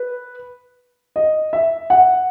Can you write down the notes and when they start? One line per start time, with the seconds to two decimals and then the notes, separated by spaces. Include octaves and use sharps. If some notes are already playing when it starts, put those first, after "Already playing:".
Already playing: B4
1.16 D#5
1.53 E5
1.90 F#5